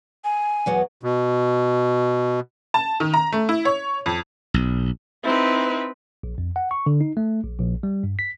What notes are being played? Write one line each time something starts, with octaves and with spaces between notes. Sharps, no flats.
G#5
E2 F#3 B3
B2
A5
D#3
A#5
A3
E4
C#5
F2
B1
C4 D#4 E4 B4
A#1
F2
F#5
C#6
D3
D#4
A3
A#1
A#1
G3
G2
B6